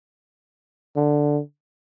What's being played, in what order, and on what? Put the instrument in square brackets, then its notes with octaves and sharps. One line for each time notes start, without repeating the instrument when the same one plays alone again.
[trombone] D3